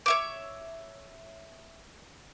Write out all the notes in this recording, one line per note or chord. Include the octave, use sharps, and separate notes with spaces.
C#5 E5 D6